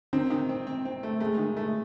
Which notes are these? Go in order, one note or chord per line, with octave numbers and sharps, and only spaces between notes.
D#3 C4
D#3
C4
C4
C4
A3
G#3 A3
D#3
A3